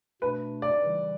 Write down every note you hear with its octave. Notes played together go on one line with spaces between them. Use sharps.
B2 A3 D4 B4
D5
C#3 E3 G3